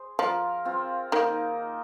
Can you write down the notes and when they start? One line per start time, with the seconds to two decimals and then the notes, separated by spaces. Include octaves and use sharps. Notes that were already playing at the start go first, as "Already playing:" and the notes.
Already playing: G#4 C5
0.19 F3 F4 A#4
0.65 C4 F4
1.12 D#3 A#3 D#4